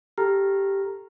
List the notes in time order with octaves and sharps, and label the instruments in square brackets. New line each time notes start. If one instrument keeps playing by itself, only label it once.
[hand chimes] G4 [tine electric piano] A4 A#5 F6